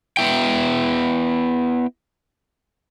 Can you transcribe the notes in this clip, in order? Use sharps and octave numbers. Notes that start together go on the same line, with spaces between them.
B3 E4 G5